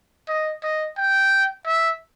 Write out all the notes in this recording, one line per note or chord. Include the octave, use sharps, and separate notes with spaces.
D#5
D#5
G5
E5